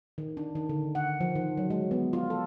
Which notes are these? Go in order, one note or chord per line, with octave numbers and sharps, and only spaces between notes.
D#3
D4
D#3
D3
F#5
F3
D#3
F#3
G#3
B3
F4
A4